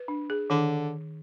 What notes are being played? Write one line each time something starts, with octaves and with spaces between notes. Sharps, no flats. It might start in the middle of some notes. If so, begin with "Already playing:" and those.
Already playing: B4
D4
G#4
D3 D#3